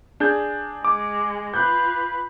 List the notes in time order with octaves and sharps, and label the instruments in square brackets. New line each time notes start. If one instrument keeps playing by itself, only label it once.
[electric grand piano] D4 G6 [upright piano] G#4
[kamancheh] G#3 [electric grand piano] D6
[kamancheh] F4 B4 [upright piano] F#6 G6